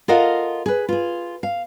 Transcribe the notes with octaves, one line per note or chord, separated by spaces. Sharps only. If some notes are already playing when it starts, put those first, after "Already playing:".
F4 A4 A#4 D#5 F5 F#5
G#4 B4
F4 G#4
F5